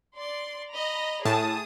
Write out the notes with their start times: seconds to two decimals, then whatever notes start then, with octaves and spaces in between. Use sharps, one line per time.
0.17 D5 C6
0.73 D#5 A#5 B5
1.25 A2 G#4 A5 D#6